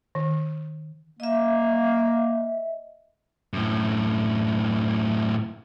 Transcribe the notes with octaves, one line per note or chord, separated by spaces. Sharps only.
D#3
A#3 D#5 E5
F#2 A2